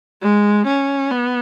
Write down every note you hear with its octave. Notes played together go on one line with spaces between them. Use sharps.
G#3
C#4
B3